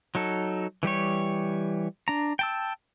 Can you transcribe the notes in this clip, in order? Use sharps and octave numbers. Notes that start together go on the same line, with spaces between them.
F#3 D#4 A4
E3 G3 G4 C#5
D4 A#5
G5 A5 E6